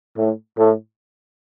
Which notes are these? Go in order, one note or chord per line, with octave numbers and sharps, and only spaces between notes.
A2
A2